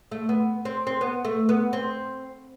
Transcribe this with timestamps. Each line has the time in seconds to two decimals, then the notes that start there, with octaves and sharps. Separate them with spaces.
0.11 A3
0.29 B3
0.65 C4
0.87 C4
1.01 B3
1.25 A3
1.49 B3
1.73 C4